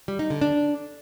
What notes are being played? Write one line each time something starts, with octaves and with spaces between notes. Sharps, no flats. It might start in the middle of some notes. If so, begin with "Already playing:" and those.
G3
D#4
D3
D4